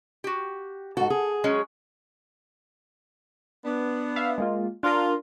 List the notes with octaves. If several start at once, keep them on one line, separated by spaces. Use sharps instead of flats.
F#4 G4
G#2 F#4 A4
G#4
F#3 G#3 C#4
B3 D4
E5 F5
G#3 A#3 F4
D4 F4 A#4